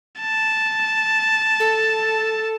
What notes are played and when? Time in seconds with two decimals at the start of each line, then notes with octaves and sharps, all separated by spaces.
0.21 A5
1.60 A4